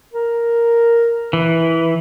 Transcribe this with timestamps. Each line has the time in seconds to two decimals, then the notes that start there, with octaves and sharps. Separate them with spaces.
0.14 A#4
1.33 E3